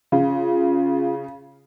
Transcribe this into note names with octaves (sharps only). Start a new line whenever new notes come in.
C#3 F4